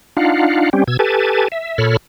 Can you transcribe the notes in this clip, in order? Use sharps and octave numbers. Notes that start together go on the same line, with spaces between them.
D4 D#4 F4 F5 F#5
G3 C4 C#4 G4
B2 E6 G#6
G4 A4 B4 G#5 A5
E5
A#2 A4 C#5 B5 F6